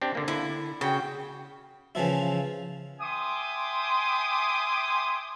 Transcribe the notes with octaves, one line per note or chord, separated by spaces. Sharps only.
C4 D4 G4
D3 A#3
D3 E4
C#3 F#4 G5
C#3 E3 F3 E4
E5 G5 G#5 C6 D6 D#6